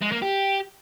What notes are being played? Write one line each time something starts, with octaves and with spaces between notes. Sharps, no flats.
G#3
A#3
G4